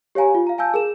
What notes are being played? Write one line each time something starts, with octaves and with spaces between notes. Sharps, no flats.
G4 C#5 F5 G#5 A#5
F4
F5 A#5
F5 G#5 A5 E6 G6
G#4 A#4 E7